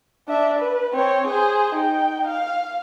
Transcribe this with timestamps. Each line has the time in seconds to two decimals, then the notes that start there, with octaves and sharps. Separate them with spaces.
0.28 D4 E5
0.58 B4
0.94 C4 C#5
1.27 G#4 C5
1.75 D#4 G5
2.27 F5